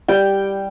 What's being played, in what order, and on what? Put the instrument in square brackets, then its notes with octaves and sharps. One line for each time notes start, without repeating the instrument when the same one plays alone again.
[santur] G3 G5